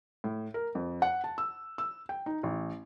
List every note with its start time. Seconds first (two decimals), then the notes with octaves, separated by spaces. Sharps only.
0.24 A2
0.54 A#4
0.75 F2
1.02 F#5
1.24 A5
1.38 E6
1.78 E6
2.09 G5
2.26 D#4
2.43 A1